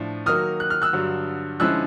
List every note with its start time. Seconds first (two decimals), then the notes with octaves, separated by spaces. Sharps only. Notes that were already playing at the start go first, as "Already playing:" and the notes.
Already playing: A2 F3 D4
0.26 D#3 F#3 A#3 D#6 F6
0.60 F#6
0.70 F6
0.82 E6 F#6
0.93 G2 D3 F#3
1.60 D3 F3 G#3 C#4 E4 E6 F#6